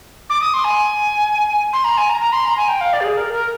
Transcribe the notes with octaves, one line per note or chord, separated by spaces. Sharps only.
D6
D#6
C6
G#5
C6
A#5
G#5
A#5
A#5
C6
A#5
G#5
G5
F5
D5
G4
G#4
A#4
A#4